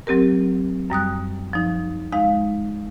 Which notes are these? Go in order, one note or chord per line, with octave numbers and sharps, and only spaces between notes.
F#3 C4 G4 A#4
F#2 G3 D#6 F#6
F3 D#4
G#3 D#4 F5